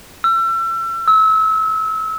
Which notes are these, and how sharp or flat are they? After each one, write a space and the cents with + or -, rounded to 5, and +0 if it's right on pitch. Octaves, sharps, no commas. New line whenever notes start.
E6 +35
E6 -30